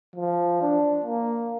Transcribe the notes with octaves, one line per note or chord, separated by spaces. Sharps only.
F3
D4
A#3